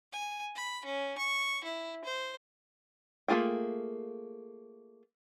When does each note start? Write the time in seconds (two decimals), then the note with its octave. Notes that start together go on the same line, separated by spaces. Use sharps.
0.12 G#5
0.55 B5
0.85 C#4
1.18 C#6
1.64 E4
2.04 C5
3.28 A3 A#3 F4 G#4 G5